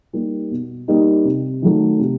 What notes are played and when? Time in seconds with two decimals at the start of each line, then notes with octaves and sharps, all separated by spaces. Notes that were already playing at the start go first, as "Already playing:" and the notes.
0.13 G3 A#3 D#4 G4
0.51 B2
0.88 G3 A#3 D#4 G4
1.25 C3
1.62 D#3 F#3 A3
1.99 C3